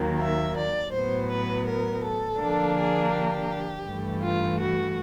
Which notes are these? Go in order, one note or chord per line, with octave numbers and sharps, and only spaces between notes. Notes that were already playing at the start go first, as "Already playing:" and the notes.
Already playing: D#2 D#3 F#3 A#3
E5
D5
A2 F#3 B3 C5
B4
A#4
A4
D3 F3 A#3 D4
G#4
G4
G2 E3 A3
F4
F#4